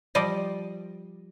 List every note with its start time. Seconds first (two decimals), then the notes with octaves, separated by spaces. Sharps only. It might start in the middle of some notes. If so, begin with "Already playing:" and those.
0.15 F3 G3 D5 D#5